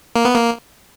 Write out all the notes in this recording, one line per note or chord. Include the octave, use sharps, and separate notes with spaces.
A#3
B3
A#3